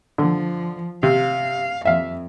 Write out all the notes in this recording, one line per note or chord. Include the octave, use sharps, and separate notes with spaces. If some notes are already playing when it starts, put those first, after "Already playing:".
D3 F3
C3 F5
F2 E5 F5